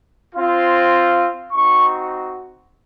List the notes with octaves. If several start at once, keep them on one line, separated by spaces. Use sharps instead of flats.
C4 F4
C4 D#4 F#4 C#6